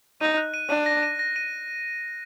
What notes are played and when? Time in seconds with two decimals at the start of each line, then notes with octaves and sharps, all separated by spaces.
0.21 D#4 D#7
0.37 F#6
0.54 D#7
0.70 D4 D#7
0.86 A#6
1.03 D#7
1.19 A#6
1.36 D#7